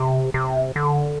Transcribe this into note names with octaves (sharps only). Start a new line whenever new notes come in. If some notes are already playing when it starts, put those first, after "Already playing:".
Already playing: C3
C3
D3